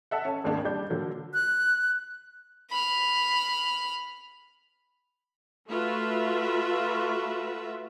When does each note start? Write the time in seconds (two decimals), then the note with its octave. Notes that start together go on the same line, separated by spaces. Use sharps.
0.11 A4 E5 F#5
0.25 C#4 A4
0.44 G#1 D#2 A#3 D4 G#4
0.65 G3 D4 D5 G6
0.90 A#2 D3 F#3 A#3
1.34 F#6
2.70 B5 F6
5.69 A3 F4 F#4 B4 E5